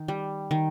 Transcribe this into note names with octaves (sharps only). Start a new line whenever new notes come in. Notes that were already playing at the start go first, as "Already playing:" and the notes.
Already playing: D#3
G3
D#3